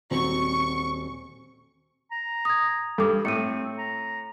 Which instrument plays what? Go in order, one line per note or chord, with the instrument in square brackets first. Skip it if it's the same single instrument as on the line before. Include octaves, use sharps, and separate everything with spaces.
[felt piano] D#1 F#3 C4 [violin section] C#6
[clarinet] A#5
[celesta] D#6 G#6
[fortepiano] G2 [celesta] A4 D6
[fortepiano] A2 [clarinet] C4 [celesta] C#7 D#7
[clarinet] A#5